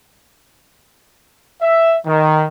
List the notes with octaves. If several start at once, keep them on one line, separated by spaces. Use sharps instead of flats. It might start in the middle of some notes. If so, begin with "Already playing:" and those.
E5
D#3